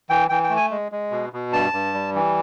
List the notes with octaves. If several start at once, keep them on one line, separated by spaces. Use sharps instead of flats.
E3 G5
E3 G5
G5
A3
G#5
G#3
G#3
B2
B2
G2 A5
G2
G3
E3